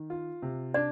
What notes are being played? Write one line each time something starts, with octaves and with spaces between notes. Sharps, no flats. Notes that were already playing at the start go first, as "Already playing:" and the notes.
Already playing: D#3
F4
C3
D4 D5